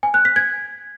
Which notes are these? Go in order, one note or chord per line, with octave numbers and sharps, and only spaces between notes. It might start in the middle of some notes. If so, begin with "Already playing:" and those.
G#5
F#6
B6
G#6